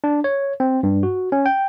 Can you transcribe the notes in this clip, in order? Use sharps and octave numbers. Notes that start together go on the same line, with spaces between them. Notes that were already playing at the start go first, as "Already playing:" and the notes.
D4
C#5
C4
G2
F#4
C#4
G5